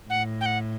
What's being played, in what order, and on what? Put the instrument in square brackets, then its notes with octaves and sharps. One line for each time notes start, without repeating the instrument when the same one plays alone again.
[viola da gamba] A2 [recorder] F#5
[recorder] G5
F#5